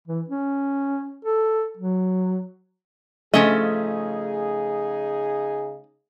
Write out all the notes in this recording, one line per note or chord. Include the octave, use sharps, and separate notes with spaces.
E3
C#4
A4
F#3
C#3 F3 A3 C#4 D#4 G#4 D#5